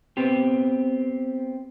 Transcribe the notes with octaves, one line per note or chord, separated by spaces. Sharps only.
B3 C4 G4